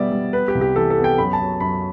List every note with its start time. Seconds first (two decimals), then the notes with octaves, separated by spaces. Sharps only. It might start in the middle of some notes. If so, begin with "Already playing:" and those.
Already playing: B2 G3 B3 D5 E5
0.12 G3
0.33 B3 B4
0.48 G4
0.55 C2
0.61 G4
0.75 E3 A4
0.90 A4
0.97 B3
1.04 G5
1.18 F#2 B5
1.33 A5
1.40 F#3
1.60 F#2 B5